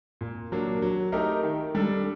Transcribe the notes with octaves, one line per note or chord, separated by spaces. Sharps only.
A#2
F#3 A#3 D4
F#3
A3 D#4 G4 A#4
D#3
G3 D4 A4